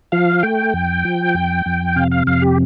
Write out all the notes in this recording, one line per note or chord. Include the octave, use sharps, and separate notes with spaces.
F3 F5
A3 G5
F2
F3
F2
F2
C3 F5
F5
F2 F5
G4